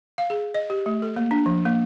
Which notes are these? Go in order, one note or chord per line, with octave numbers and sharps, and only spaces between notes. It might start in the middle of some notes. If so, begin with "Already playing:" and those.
F5
G#4
D#5
G4
A3
A4
A#3
D4
F3
A#3